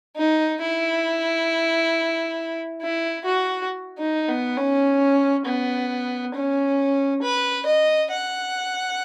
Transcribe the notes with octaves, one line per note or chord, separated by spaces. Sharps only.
D#4
E4
E4
F#4
D#4
B3
C#4
B3
C#4
B4
D#5
F#5